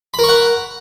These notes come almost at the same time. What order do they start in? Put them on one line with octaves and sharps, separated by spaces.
B5 A#4 C#6 F#5